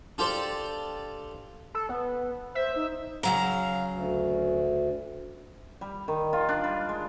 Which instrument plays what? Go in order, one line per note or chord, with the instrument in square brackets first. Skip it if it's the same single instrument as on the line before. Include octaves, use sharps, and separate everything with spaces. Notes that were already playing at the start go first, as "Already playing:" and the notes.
[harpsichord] D4 F4 G4 A4 C5 D5
[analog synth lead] A4
B3
[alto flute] C5 [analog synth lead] E5
[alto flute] D#4
[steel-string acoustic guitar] C#3 F#3 A#5 [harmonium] F5
[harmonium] D2
[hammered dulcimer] G3
D#3
F4
D4
G3
G#3